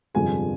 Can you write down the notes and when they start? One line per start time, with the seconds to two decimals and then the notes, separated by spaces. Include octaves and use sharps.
0.14 G1 F2 C3 F3 G#3 G#5